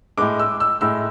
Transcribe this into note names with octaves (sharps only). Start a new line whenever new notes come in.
A2 G#3 D6
E6
E6
A2 G#3 E6